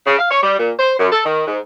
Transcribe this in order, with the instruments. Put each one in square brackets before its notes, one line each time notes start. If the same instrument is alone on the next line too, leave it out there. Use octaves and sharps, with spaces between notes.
[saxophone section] C#3
F5
C#5
G3
A#2
C5
F#2
A4
D#3
G#2